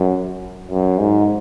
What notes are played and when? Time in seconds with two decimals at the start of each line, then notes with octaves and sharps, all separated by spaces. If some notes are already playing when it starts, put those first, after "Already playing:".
Already playing: F#2
0.71 F#2
1.00 G#2